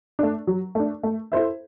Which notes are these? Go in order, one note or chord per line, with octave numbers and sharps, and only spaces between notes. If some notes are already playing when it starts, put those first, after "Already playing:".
A3 D4
F#3
A3 D4
A3
E4 A4 C5 E5